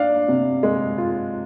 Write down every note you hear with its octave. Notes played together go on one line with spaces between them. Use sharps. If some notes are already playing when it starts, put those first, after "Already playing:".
Already playing: D4 F5
C3
G#3
F4